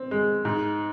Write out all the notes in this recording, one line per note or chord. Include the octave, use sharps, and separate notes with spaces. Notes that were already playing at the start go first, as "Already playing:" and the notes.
Already playing: C4
G#3
G#2